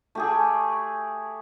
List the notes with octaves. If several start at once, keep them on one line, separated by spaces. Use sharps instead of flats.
A3 G4 G#4